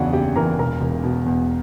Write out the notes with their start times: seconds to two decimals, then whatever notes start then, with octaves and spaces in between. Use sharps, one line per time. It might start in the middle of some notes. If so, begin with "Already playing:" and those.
Already playing: F#1 E2 C#3 E3 D4 F#4 D5 F#5
0.13 F#1 G4 G5
0.36 E3 A#4 A#5
0.59 E1 A#4 A#5
0.81 E1
1.03 B2
1.26 E2